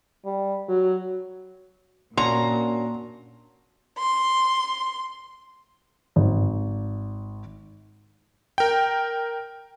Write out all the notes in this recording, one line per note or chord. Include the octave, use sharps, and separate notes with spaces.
G3
F#3
A#2 C#4 D4 F#4 A#5 C6
C6
G#1
A#4 G5